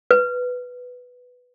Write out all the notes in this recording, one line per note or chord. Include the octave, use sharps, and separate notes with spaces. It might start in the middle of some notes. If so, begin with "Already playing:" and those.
B4